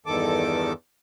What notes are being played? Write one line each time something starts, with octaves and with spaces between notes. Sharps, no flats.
E2 G2 D#3 A4 D6